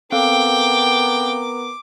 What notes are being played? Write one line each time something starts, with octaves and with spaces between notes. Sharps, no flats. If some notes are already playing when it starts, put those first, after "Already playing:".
B3 C4 A4 A#4 F5 G5 D6